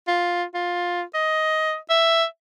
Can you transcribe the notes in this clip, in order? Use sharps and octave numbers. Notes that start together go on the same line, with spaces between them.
F4
F4
D#5
E5